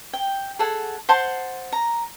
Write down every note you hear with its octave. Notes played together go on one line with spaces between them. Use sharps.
G5
G#4 A4 F#5
C5 F#5 A5 C6
A#5